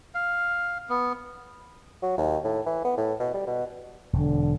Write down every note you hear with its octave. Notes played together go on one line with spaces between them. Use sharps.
F5
B3
F#3
D#2
A2
E3
B3
A2
B2
G3
B2
E1 D3